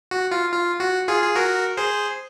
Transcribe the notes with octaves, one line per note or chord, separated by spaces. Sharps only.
F#4
F4
F4
F#4
F4 G#4
G#4
F#4 A#4
G#4 C5